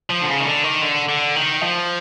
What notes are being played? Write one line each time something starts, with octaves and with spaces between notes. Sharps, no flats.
F3
D3
C#3
D#3
D3
D#3
D3
D3
D#3
F3